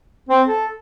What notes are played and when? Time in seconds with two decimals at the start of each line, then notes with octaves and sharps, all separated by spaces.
0.29 C4
0.47 A4